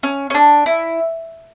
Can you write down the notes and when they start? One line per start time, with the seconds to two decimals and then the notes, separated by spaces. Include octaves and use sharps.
0.03 C#4
0.30 C#4
0.34 D4
0.66 E4